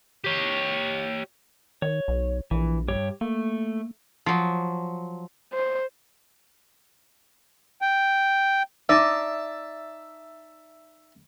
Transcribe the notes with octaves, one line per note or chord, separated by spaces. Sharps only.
G4 C#5
D#3 C#5
B1
A#1 E3
G2 G4 C#5
A3 A#3
F3 F#3
C5
G5
D#4 D5 E5 A5